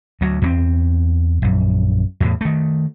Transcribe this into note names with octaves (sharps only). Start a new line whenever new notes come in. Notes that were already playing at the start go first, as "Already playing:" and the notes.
D2 F#3
E2 A3 C4
A#1 F#2
E2 A2
D#3 A3